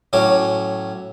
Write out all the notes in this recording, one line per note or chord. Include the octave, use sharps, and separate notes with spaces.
A2 F#3 C#4 D6